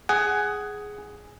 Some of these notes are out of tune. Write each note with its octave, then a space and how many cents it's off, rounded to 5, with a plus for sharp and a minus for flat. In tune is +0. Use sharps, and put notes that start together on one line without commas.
G#4 +0 F#5 +15